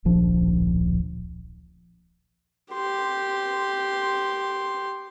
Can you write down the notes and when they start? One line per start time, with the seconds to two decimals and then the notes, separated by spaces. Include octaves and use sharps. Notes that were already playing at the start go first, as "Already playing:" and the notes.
0.05 D1 A#1 F3 D4
2.73 G4 C6